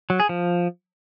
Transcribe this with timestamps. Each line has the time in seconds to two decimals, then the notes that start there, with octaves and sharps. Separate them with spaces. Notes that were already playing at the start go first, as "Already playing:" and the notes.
0.10 F#3
0.20 G#4
0.29 F3